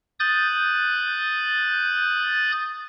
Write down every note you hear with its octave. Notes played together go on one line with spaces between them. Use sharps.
D#6 F#6 G6 A6